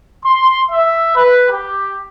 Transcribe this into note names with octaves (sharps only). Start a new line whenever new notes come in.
C6
E5
B4
G4